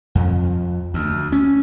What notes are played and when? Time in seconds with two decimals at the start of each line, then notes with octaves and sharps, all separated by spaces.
0.15 F2
0.94 D2
1.32 C#4